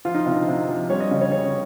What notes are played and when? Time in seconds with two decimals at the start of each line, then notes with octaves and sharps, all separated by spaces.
0.05 F3 F4
0.14 D#4
0.26 C3
0.32 D#4
0.48 C3
0.69 F3
0.90 G3 C#5
1.00 D#5
1.11 C#3
1.21 C#5
1.32 C#3 C#5